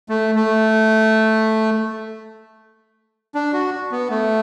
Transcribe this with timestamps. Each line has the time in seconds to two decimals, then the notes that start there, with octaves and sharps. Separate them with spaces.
0.09 A3
0.35 A3
3.35 D4
3.53 F#4
3.91 B3
4.10 A3